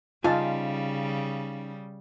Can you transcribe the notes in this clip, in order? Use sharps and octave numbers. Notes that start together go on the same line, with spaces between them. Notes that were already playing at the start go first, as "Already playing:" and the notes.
C#3 G3 C#4 D#4 F4 F5 G#5 A5